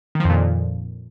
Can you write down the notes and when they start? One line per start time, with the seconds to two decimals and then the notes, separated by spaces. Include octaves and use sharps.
0.15 D#3
0.20 F3
0.25 F2
0.30 A#2